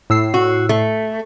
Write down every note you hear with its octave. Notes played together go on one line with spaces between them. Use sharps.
A2 E6 C7
F#4
A3